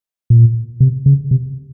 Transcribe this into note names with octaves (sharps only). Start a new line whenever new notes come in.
A#2
C3
C#3
C3